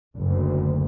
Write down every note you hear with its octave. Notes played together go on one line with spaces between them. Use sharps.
F#1 D2